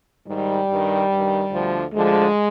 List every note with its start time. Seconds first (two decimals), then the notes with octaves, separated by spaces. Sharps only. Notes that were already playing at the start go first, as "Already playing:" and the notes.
0.27 G#2 D#3 G3
0.69 G2 D#3
1.10 G2 D#3
1.51 D2 D3 F3
1.93 D2 D3 F3 G#3